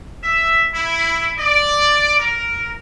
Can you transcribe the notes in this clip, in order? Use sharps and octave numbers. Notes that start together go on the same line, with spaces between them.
E5
E4
D5
A#4